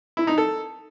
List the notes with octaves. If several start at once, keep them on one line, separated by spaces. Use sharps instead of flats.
E4
D#4
A4